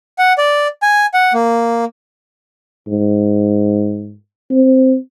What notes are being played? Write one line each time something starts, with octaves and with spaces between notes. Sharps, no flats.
F#5
D5
G#5
F#5
A#3
G#2
C4